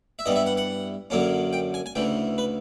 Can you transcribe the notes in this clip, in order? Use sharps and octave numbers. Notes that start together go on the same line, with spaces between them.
E5
G2 E3 G3 B3 D#5
E5
F#5
F#5
F#2 D3 F#3 A#3 C#4
G5
G#5
G#5
D2 C#3 E3 G5
B4